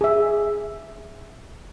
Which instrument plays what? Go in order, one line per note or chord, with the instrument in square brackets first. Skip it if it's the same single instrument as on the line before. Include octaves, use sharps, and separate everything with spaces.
[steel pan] G#4 E5